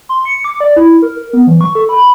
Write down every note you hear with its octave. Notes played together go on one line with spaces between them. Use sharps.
C6
C#7
D6
D5
E4
A#4
A#4
B3
E3
C#6
A4
B5